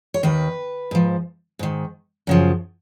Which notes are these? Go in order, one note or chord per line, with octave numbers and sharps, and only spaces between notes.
C#5
D#2 D#3 B4
G#2 F3
G#2 D#3
F#2 C#3 F3